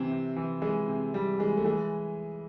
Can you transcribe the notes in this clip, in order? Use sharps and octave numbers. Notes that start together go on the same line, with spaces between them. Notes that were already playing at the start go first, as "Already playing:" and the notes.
Already playing: C3 E3 C4
C3
E3
E3 G#3
C3
C3 G3
E3 G#3
A3
E3 G#3